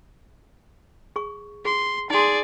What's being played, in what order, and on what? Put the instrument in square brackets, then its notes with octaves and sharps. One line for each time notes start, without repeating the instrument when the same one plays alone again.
[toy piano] G#4 C#6
[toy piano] G#4 [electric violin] C6
[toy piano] D#4 C6 [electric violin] G#4 D5